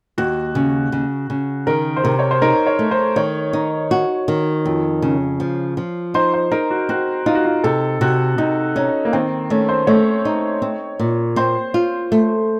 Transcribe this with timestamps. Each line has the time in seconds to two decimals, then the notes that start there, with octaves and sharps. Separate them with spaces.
0.18 D#2 F#4
0.55 C#3
0.92 C#3
1.30 C#3
1.67 D#3 A#4
1.96 C5
2.04 C3 A#4
2.19 C#5
2.31 C5
2.42 D#4 A#4
2.67 C#5
2.79 A3
2.91 C5
3.16 D#3 C#5
3.53 D#4
3.91 F#4
4.28 D#3
4.66 F2
5.02 C#3
5.40 F3
5.77 F3
6.14 D#4 C5
6.34 C5
6.51 D#4 A#4
6.71 F#4
6.89 C4 F#4
7.26 D#4 F4
7.35 F#4
7.45 F4
7.64 C3 A4
8.01 C3 F#4
8.38 C3 D#4
8.76 C#4 D#4
9.05 A#3
9.13 D#3 C4
9.50 A3 C#4
9.69 C5
9.87 A3 C#5
10.25 D#4
10.62 C4
11.00 A#2
11.36 C4 C5
11.74 F4
12.12 A3